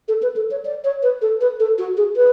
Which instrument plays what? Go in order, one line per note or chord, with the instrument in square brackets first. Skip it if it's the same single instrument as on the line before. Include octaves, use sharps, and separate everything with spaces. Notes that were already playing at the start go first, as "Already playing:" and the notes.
[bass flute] A4
B4
A4
C#5
D5
C#5
B4
A4
B4
A4
F#4
G#4
B4